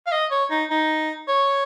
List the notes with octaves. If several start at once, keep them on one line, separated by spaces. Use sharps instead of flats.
F5
D#5
C#5
D#4
D#4
C#5